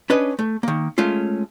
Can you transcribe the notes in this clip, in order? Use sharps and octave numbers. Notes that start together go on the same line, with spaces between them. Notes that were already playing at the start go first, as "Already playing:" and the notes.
C#4 D4 B4 C#5 D#5
A3
D#3 A#3
G#3 A3 C#4 F4